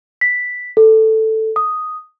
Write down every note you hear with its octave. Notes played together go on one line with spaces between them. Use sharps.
B6
A4
D#6